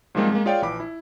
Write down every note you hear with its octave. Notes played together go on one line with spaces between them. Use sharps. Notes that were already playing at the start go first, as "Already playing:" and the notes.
G#2 F3 G3 G#3 A#3 C4
G#3 A#3
F4 G#4 C#5 D5 F5 G5
A#1 E3 B5 D6
E4